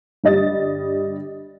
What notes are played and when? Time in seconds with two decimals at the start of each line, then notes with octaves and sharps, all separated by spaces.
0.24 G1 G3 D#5 A6